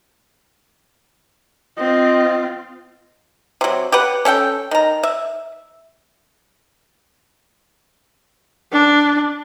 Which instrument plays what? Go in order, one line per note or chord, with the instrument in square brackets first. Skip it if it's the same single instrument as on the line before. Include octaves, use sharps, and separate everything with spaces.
[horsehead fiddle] C4 F4 [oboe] D#5
[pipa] C3 F#3
G4 B4 F#5
C#4 A4 F#5 G5
D#3 A#5
E5
[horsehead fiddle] D4